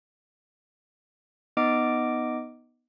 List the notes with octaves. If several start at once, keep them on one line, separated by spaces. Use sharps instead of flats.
B3 D#4 D#5 D6 D7